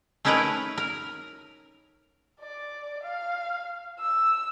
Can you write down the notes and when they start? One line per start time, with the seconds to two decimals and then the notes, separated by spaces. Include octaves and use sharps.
0.25 A3 C#4 D#4 E4 A#4 B4
0.78 A#4
2.40 D5
3.04 F5
4.00 E6